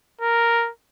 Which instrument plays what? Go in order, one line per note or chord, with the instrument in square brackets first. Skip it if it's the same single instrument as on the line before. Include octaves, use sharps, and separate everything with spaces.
[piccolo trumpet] A#4